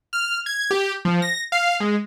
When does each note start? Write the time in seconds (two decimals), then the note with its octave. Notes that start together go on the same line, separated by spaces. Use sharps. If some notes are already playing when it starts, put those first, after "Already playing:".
0.13 F6
0.46 G#6
0.71 G4
1.05 F3
1.22 A#6
1.52 F5
1.80 G#3